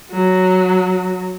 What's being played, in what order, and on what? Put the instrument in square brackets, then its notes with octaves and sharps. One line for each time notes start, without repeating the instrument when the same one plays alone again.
[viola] F#3